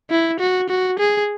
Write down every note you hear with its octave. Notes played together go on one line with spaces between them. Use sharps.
E4
F#4
F#4
G#4